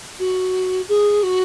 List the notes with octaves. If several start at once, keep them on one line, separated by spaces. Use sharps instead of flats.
F#4
G#4
F#4